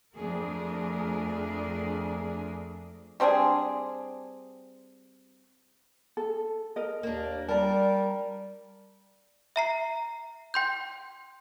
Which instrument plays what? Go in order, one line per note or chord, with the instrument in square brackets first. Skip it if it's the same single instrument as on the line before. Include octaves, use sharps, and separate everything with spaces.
[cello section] F2 A3 D4 G#4 A#4
[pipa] G3 C4 D4 G#4
[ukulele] A4
A#4 D#5
[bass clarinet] D#2 [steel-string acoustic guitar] A#3 D4
[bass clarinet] G3 [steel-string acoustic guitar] A#4 [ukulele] D5 A5
[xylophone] E5 A#5 C7
G5 C6 G6